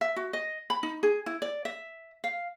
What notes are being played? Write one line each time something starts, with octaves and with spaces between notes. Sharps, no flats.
E5
F#4
D#5
B5
D#4
G#4
E4
D5
E5
F5